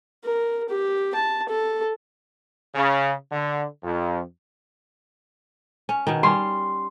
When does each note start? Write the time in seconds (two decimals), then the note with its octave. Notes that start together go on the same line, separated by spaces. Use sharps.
0.24 A#4
0.69 G4
1.14 A5
1.49 A4
2.74 C#3
3.32 D3
3.83 F2
5.89 C#4
6.07 B2 D#3
6.23 G3 C#4 C6